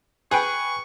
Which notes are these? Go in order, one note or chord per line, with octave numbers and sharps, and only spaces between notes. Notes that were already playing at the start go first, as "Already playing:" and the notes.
G#4 B4 G5 C#6